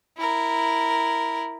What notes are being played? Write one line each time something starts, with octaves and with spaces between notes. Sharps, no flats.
E4 A#4